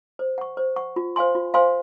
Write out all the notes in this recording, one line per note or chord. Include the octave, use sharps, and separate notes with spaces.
C5
F#5 C#6
C5
F#5 C#6
F4
C5 F5 G#5 C6
F4
C5 F5 G#5 C6